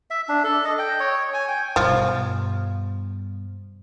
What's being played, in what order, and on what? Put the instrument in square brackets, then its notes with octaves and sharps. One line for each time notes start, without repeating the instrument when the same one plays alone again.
[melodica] E5
D4
A4
D#5
G5
C#5
G#5
G5
[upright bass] G2 B2 [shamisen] F3